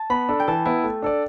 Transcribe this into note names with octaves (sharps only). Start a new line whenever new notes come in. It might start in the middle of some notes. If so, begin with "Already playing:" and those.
Already playing: A5
B3 B5
D4 A4
G5
E3 A5
B3 E4 B4
A3
D4 A4 D5